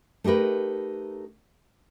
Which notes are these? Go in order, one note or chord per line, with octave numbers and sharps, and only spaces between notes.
A3 D#4 G4 A#4 B4